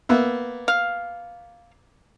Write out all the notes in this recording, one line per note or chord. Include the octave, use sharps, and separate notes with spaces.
A#3 B3 E5
F5